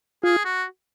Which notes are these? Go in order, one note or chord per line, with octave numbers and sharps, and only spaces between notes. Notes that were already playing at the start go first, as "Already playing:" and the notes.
F4 G#4
F#4